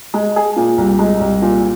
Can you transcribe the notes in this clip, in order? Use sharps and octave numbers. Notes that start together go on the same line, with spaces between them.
G#3
G#4
A#2
C2
G#3
C2
A#2